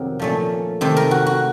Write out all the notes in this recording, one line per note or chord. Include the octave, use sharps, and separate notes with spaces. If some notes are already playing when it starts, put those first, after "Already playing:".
Already playing: F2 C3 D#3 F#3 A#4
A#2 F3 A3 C#4
C3 D#3 A3 C5
A#4
F#4
F#4